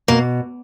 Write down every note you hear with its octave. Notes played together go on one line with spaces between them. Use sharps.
B2 A#3